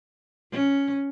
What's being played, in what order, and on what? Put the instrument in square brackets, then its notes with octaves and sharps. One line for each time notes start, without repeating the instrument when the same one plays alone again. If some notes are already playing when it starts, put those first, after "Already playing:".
[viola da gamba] C#4